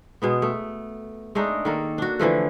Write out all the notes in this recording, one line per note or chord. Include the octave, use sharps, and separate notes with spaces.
B2 G#3 B3
A3
G#3 A3 D4 D#4
D#3 A#3 A4
D4 F#4
D3 E3 F3 A3